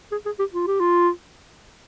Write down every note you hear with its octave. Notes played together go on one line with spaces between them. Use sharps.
G#4
G#4
G4
F4
G4
F4